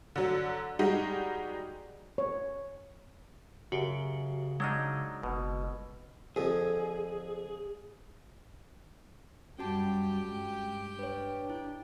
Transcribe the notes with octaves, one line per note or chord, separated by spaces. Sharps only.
D3 F#3
G3 G#3 D#4 F#4 G4
C#5
F#2 C#3 F#4 G4
F#3 G#3 D4 D#4 E6 F6
F#1 B2
F2 D3 G#4
F#2 G3 C#4 F#4 G4 G5 A5
G2 G#3
D4 B4 C#5
E4